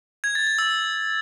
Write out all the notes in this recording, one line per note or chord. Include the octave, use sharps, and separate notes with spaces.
G#6
A6
A6
E6